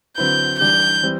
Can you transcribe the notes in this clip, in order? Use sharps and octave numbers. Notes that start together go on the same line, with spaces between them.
D3 F#3 C4 E4 B4 G6
E3 G3 D4 G4 G6
E3 G3 C4